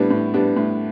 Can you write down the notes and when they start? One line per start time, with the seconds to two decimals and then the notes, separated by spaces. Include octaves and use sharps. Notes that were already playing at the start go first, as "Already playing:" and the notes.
Already playing: A2 G3 B3 D4
0.11 A2
0.34 G3 B3 D4
0.57 A2